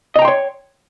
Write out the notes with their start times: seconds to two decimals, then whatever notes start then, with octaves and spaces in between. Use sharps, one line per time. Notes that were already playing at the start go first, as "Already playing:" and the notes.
0.16 D#5
0.19 A#5
0.22 G5
0.25 C6
0.28 C#5